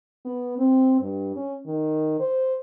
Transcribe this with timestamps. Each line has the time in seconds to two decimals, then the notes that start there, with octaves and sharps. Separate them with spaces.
0.25 B3
0.58 C4
1.01 G2
1.36 C#4
1.66 D#3
2.20 C5